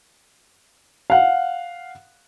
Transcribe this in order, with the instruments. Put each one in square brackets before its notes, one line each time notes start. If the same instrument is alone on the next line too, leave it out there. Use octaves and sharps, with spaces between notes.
[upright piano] F5 F#5